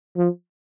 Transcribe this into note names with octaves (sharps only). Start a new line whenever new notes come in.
F3